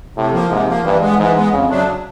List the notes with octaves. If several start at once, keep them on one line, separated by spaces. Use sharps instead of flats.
A2 C3
F3 A#3
G#2 C3
F3 A#3
G2 E3
G#3 B3
G#2 E3
G#3 B3
F2 C#3
C#3 F#3 A3 D4